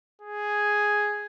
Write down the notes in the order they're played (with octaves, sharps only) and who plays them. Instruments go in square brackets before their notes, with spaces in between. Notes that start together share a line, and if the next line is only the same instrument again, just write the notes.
[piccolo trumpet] G#4